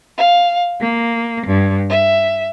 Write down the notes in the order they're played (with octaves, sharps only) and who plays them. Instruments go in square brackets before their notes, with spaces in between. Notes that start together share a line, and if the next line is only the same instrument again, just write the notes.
[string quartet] F5
A#3
G2
E5